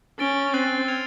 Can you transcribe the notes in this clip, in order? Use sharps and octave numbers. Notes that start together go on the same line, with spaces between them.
C#4 A6 D7 G7
C4 F#6 A6 C7 D#7 F#7
F6 G#6 C#7 F7